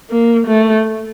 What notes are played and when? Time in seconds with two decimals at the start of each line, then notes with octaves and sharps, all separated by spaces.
0.11 A#3
0.47 A3